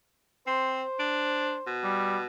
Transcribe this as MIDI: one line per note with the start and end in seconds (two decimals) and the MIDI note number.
0.47 0.82 60
0.47 1.74 72
1.00 1.57 62
1.67 2.26 47
1.84 2.17 55